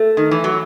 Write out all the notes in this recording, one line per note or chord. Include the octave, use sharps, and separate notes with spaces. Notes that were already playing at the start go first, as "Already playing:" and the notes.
Already playing: A3
D#3
E3
F#3